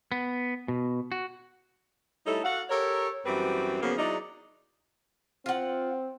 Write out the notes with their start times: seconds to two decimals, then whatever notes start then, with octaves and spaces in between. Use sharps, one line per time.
0.12 B3
0.68 B2
1.12 F#4
2.26 G3 A3 D#4 E4 A4 C#5
2.44 F#4 A4 F5 F#5
2.70 G4 A4 A#4 C#5
3.26 F#2 E3 G3 C4 F#4 B4
3.82 C#3 F3 F#3 A#3 B3
3.98 F#3 G#3 D#4 E4 D5
5.46 C4 F4 F#5